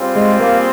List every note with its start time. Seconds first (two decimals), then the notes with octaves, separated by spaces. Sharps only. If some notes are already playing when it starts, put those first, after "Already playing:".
Already playing: G3 C4 F4 G#4
0.16 G#3
0.40 A#3